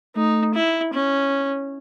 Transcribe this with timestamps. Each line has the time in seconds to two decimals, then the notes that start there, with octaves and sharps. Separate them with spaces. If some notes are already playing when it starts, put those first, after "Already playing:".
0.16 A3 D#4
0.54 E4
0.93 C#4